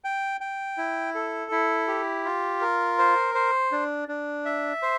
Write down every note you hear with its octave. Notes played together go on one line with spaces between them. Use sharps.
G5
G5
E4
A4
E4
G4
F4
A#4
C5
C5
D4
D4
E5
C5